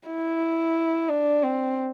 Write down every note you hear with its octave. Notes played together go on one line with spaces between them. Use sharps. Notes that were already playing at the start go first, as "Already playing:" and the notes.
E4
D4
C4